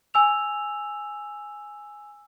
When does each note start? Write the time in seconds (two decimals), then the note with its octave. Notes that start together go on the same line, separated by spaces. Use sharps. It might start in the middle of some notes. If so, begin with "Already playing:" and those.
0.14 G#5 E6 F7